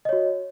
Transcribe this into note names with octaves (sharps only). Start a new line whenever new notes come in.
F#4 C#5 D#5